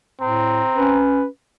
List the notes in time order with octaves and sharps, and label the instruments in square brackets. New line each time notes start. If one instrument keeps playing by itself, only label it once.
[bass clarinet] A2 [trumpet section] C4 A#5
[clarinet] C#4 [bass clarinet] B4